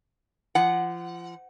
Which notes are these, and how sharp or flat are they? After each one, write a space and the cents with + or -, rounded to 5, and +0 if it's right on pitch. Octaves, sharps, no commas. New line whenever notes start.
F3 -30 F#5 +0